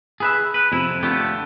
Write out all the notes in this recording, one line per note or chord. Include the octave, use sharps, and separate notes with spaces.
G#4 B4 E5
B4
F2 C3 E4
F2 D3 A3 B3 G4